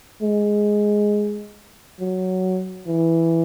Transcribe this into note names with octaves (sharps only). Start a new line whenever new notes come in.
G#3
F#3
E3